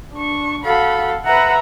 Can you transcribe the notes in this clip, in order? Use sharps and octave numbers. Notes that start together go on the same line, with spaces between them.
D4 C#6
F#4 A4 F5 B5
B4 E5 F#5 A#5